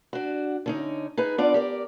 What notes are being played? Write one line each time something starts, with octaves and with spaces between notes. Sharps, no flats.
D4 F#4
D3 C#4 D#4
D#4 G#4 B4
B3 D4 F4 A#4 D5
G4 A#4 D5